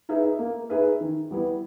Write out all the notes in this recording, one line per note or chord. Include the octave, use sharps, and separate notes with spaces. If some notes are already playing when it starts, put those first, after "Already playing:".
D#4 G#4 B4 E5
A#3
D#4 G#4 B4 E5
D#3
G3 B3 E4